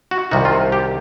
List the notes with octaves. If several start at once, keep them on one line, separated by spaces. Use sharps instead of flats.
F#4
C2 C3 D#3 F#4
F4
G4